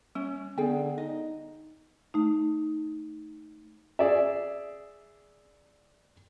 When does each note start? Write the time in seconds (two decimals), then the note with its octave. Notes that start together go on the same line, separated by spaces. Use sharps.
0.15 G3 C#4
0.58 D3 B3 G#4 G5
0.98 D#4 D#5
2.14 A3 D#4
3.99 G#4 D5 E5